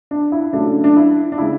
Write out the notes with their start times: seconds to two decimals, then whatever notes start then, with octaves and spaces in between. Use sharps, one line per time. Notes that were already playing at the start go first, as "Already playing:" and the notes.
0.11 D4
0.32 E4
0.53 C#2 C#3 F#3 A3 D4
0.84 D4
0.97 E4
1.32 D4
1.38 C#3 G#3 E4